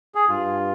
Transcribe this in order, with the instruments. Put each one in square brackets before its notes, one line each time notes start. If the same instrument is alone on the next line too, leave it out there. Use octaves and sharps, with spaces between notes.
[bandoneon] G#4
[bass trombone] G2 [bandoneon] F4